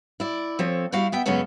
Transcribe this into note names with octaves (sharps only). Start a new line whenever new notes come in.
E4 D5
F3 C4 A4 C#5
G3 E4 F#4 F5
B3 E5 G5
F#2 C#3 G#3 B3 C#4 A4